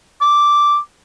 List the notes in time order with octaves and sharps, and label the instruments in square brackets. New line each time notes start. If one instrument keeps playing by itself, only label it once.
[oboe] D6